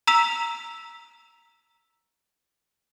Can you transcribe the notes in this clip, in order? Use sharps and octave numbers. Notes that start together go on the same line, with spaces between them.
A#5 E6 B6 F7